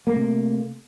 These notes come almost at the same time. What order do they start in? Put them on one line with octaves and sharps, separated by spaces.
A#3 A3 C3